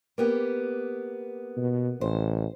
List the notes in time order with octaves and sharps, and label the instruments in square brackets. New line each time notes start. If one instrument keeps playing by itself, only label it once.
[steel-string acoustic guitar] A#3 B3 G4
[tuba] B2
[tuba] A1 [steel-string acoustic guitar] C5